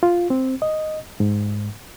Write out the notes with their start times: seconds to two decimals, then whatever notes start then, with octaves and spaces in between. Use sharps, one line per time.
0.03 F4
0.30 C4
0.62 D#5
1.20 G#2